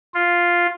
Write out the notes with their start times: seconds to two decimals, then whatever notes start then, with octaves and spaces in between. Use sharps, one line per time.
0.14 F4